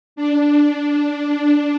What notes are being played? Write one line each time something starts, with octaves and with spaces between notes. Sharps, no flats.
D4